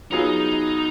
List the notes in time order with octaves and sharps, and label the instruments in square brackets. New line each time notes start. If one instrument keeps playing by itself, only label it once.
[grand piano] F#3 B3 F4 G#4 [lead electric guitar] D#4